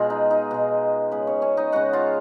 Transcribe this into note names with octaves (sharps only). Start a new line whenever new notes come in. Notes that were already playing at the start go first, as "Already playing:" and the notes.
Already playing: B2 G#3 F4
D#4
D#4
B2 G#3
C#3 G#3 B3 B4
C#4 C#5
C#4 C#5
D#4 D#5
C#3 G#3 F#4 F#5
F4 F5